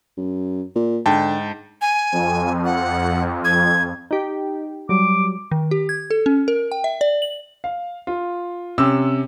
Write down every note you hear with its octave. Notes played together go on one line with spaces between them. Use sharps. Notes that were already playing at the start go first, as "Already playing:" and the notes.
F#2
A#2
G#2 D3 G5 A5
G#5
F2
F#5
G#6
D#4 G4
F#3 G3 D6
D#3
G4
G#6
A4
C#4
A#4
G5
E5
D5
F#7
F5
F4
C3 C#4 E6